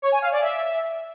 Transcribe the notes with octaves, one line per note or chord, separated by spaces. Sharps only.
C#5
G#5
F5
D5
E5